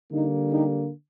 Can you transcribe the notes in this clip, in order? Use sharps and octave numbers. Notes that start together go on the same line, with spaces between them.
D3 G3 A#3 D#4
D#4 G4